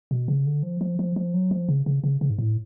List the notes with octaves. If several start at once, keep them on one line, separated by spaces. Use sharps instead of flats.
B2
C#3
D3
F3
F3
F3
F3
F#3
F3
C#3
C#3
C#3
C#3
G#2
A2